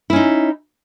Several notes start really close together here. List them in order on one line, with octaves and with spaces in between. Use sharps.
E4 C#4 D#4